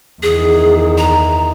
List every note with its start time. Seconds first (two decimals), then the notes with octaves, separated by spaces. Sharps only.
0.23 E2 D#3 G#4
0.98 A#5